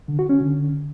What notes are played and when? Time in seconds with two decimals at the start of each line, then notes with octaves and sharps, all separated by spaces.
0.08 D3
0.19 F#4
0.29 C#4
0.40 D3